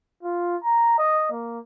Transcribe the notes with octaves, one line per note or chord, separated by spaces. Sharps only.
F4
A#5
D#5
A#3